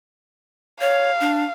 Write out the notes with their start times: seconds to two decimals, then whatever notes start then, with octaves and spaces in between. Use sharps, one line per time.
0.81 C#5 F5
1.20 D4